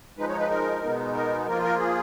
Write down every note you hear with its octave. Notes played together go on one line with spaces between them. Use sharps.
F3 G#3 D#4 B4
C#5
B4
A#4
B2 G#3 B3 D#4
A#4
F3 A#3 F4 A#4
A#4
G#4